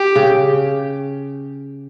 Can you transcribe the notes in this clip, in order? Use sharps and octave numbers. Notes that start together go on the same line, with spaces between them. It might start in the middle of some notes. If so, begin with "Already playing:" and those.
Already playing: G4
C#3